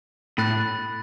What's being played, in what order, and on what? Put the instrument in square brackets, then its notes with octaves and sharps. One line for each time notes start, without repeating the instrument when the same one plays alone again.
[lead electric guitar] A2 [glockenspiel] B5 F#6 A6